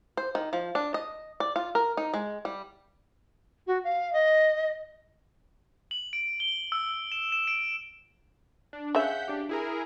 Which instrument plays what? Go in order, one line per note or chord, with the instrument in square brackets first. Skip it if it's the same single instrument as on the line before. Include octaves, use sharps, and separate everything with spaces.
[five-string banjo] C5
D#3
F3
D4
D#5
D5
F4
A#4
D#4
G#3
G3
[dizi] F#4
F5
D#5
[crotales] F#7
D7
G7
E6
E6
E7
E7
D7
[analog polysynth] D4
[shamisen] C#3 E5 [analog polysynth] F#5 G6 B6
[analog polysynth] D4 G4
E4 G#4 A#4